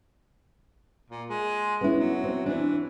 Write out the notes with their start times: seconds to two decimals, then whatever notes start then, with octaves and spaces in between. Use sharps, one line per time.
1.10 A#2
1.29 G#3
1.81 B3 C#4 E4
1.98 F#3
2.24 C4
2.46 E3 D4